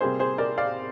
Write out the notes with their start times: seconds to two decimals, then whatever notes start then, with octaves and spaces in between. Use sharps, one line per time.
0.01 C3 G3 A#3 G#4 C5
0.19 G#4 C5
0.38 A#4 D5
0.58 D5 F5